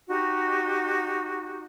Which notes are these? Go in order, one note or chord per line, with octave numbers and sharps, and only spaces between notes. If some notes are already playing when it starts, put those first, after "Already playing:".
D#4 F#4 G4